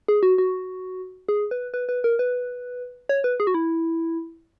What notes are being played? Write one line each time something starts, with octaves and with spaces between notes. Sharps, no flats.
G#4
F#4
F#4
G#4
B4
B4
B4
A#4
B4
C#5
B4
G#4
F#4
E4